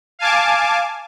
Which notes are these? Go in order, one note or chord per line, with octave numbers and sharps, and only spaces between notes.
F5 G#5 A5 D6